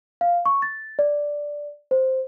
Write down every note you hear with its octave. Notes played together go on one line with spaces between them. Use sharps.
F5
C#6
A6
D5
C5